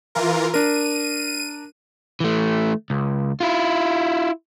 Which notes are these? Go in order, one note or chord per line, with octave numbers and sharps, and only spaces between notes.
E3 F4 A#4
D4 A#4 D#7
E3 A3
C#2
E4 F4